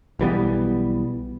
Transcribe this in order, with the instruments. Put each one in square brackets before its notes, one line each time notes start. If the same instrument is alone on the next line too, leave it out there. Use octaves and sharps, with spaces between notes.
[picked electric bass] B1 E3 G3 B3